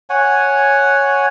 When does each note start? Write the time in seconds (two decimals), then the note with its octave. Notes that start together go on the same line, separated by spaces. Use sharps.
0.10 C#5 F#5 G#5